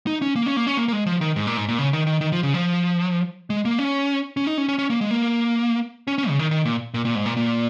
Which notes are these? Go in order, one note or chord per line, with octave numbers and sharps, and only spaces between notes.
D#4
C#4
A#3
C#4
A#3
C#4
A#3
A#3
G#3
F3
D#3
G#2
A#2
G#2
A#2
C#3
D#3
D#3
D#3
F3
C#3
F3
G#3
A#3
C#4
C#4
D#4
C#4
C#4
C#4
A#3
G#3
A#3
C#4
C#4
C#3
D#3
D#3
A#2
A#2
A#2
G#2
A#2
A#2